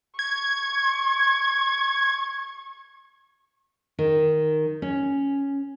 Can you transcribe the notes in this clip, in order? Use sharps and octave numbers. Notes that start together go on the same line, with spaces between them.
C#6 G#6
D#3
C#4